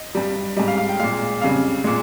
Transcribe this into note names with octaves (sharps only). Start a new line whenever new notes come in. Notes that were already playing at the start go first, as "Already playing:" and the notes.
Already playing: D#5
G2 G3
G#2 G3 D#5
F5
F5
G5
A#2 G#3 F5
F2 C#3 G3 F5
A#2 G#3